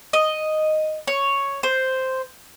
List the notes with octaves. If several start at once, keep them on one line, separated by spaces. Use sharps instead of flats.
D#5
C#5
C5